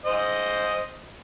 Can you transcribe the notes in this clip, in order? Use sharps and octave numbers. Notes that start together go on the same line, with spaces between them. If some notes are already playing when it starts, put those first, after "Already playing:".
C5 D#5